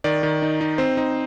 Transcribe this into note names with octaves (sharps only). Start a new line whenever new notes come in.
D#3 D5
D#3
D#4
D#4
C4 C5
D#4